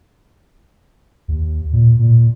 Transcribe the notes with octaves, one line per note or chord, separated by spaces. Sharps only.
D#2
A#2
A#2